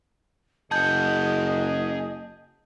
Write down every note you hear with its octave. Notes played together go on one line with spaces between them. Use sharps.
F#1 G#4 D#5 F#5 A5 G6